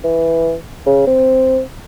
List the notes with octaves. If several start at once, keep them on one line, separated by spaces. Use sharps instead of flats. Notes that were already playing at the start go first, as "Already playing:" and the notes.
E3
C#3
C4